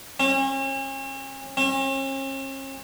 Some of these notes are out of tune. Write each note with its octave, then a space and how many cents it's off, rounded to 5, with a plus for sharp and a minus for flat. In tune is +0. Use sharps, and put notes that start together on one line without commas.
C#4 -40
C#4 -45